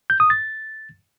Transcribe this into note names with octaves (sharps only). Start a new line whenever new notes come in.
G6
D#6
A6